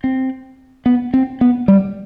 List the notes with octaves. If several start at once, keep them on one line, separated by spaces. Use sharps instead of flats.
C4
B3
C4
B3
G3